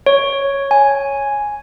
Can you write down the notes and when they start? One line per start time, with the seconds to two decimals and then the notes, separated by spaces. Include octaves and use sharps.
0.06 C#5
0.71 G#5